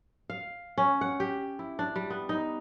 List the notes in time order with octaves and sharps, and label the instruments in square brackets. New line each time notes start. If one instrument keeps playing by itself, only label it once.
[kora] F5
C#4
F#5
G4
E4
D4
G3
B3
D#4